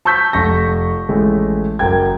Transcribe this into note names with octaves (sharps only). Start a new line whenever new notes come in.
A5 C#6 E6 G6 B6
F1 C#6 A#6
A1 G#3 A3
F#1 A#4 G5 G#6